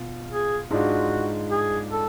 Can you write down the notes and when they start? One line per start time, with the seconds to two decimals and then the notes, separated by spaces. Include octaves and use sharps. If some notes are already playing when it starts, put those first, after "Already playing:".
Already playing: B2 F4
0.31 G#4
0.71 G#2 G#3 D4 F4 F#4
1.51 G#4
1.91 A4